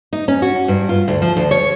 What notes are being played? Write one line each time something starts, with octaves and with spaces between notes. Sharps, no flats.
D#4
C#4
F#4
G2
F4
D2
F3
D2
C#5